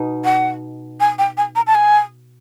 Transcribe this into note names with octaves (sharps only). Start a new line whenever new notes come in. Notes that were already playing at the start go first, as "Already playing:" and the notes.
Already playing: B2 D#4
F#5
G#5
G5
G#5
A#5
A5
G#5